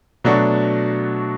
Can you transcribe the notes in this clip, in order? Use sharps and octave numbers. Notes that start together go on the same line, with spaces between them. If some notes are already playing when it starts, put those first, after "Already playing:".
B2 F#3 A3 D4 F#4